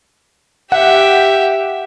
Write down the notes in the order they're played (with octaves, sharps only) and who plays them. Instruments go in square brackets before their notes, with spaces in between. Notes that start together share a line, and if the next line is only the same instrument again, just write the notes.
[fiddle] G4 E5 [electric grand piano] F#5